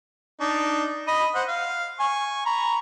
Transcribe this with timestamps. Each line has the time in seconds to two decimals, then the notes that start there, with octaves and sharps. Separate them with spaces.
0.41 D4 D#4
1.08 D#5 B5 D#6
1.35 C5 F#5
1.48 F5
2.00 G#5 C#6
2.46 A#5 B5 C#6